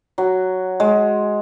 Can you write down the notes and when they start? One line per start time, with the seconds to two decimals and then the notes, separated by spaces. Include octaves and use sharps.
0.18 F#3
0.80 G#3